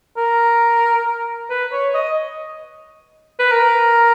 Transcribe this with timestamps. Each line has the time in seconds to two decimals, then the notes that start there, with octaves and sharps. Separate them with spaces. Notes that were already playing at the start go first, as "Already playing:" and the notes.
0.17 A#4
1.50 B4
1.72 C#5
1.95 D#5
3.40 B4
3.52 A#4